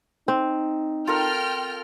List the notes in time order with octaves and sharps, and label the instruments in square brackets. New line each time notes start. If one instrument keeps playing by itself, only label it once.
[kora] C4 [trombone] D#4
[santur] F4 A4 A#4 [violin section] G5 F6